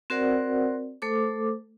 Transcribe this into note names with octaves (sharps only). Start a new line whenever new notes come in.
C4 F#4 A#4 C5 D5 F#5
A3 A4 C5 D6